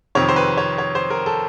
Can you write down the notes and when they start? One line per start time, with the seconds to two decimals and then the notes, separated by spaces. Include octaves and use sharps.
0.15 F2 C3 D#3 C#5
0.29 C5
0.36 B4
0.58 C#5
0.78 C#5
0.95 C5
1.10 A#4
1.26 A4